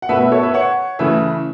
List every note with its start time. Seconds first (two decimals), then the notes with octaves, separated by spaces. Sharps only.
0.02 F#5
0.09 B2 A3 B4 E5
0.20 B4 E5
0.32 A4 C#5
0.43 B4 E5
0.54 C#5 F#5
0.99 C#3 E3 A3 B4 E5